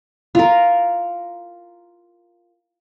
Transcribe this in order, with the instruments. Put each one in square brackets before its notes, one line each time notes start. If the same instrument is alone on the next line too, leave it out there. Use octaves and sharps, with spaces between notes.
[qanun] F4 A#4